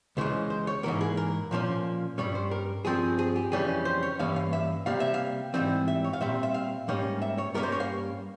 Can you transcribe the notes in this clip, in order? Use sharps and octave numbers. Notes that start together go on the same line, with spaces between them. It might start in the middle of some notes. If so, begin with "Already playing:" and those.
C#2 C#3 E3 G#3 C5
C5
C#5
G#2 E3 A#3 A#4
G#4
A#4
A#2 F3 A#3 C#4
G2 G3 C#4 C#5
C5
A#4
G2 F3 C4 G#4
G#4
G4
F2 C#3 E3 G3 C#4 G#4
C5
C#5
G2 E3 A#3 C#4 F5
F5
E5
C3 G3 A#3 F5
E5
F5
G#2 E3 G3 C4
E5
C#5
F5
A#2 G3 C4 E5
E5
F5
G#2 G3 A#3 C#4
E5
C#5
G2 G3 A#3 C#4 A#4
C5
C#5
F5